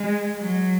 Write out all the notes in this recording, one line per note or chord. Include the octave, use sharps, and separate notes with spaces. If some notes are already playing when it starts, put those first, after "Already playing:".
Already playing: G#3
F#3